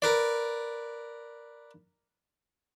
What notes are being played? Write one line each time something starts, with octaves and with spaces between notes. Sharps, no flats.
A#4 B4 D5